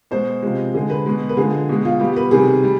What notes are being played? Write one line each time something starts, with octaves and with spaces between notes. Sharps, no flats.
B2 G#3 C5
C3 F3 G#3
D3 G#3 G#4
B4
B2 G#3
B4
D3 F3 G#3 G#4
B2 G#3
F4
B2 G3 G4
B4
C3 D#3 G3 G#4
G3